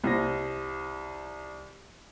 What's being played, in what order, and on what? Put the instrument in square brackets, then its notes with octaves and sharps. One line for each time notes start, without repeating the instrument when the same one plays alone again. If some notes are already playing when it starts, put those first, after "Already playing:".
[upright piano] C2 A#6